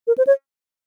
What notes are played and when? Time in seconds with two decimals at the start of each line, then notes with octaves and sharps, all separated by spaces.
0.07 A#4
0.18 C5
0.27 C#5